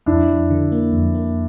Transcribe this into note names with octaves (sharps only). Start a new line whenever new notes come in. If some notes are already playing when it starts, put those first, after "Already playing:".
F2 D4 E4
F2
D3
A#3
F2
A#3